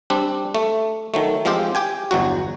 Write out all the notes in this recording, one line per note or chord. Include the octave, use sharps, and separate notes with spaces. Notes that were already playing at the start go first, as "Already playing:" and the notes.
G3 C4 D4
A3
D#3 F#3 A3
F3 G#3 C4 F4 G4
G4 G5 G#5
G1 E2 F#3 F#4